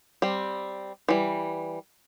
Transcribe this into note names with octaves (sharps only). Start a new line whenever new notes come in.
G3 C4
E3 G3